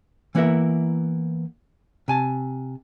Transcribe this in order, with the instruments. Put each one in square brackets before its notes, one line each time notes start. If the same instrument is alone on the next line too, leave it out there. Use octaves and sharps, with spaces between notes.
[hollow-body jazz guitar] E3 A#3 B3 E4 A#4 E5
C3 G#5 A5